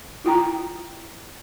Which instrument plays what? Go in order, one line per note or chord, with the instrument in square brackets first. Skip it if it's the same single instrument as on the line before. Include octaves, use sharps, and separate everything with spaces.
[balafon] E4 F4 G5 A#5